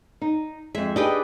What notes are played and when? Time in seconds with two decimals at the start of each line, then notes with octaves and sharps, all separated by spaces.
0.21 D#4
0.75 F2 G#3 E5
0.96 A3 D4 D#4 G4 G#4 B4 D#5 G5